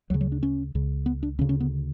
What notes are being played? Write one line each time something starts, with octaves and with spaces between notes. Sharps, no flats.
D2 C#3 F#3
F#3
D4
C#4
C#2 C#3
B3
D4
D2 C#3 C#4
C#4
B3